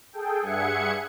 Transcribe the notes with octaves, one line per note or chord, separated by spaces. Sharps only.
G#4 A4 G5
G2 G#4 E5 F#5 G#6 C#7